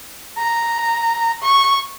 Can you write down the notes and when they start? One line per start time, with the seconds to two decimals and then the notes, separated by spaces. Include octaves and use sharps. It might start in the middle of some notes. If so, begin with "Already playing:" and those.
0.38 A#5
1.43 C#6